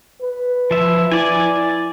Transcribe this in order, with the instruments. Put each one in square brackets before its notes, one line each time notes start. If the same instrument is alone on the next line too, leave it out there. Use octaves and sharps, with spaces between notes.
[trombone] B4
[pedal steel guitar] F3 E5
[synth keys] E4 [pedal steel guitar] D5 G#5